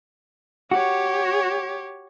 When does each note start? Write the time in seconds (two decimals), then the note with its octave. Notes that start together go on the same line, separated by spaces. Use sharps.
0.71 F#4 G4 C#5